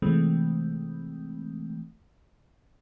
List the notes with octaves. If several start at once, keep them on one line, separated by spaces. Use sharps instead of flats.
C3 E3 G#3 A3 C4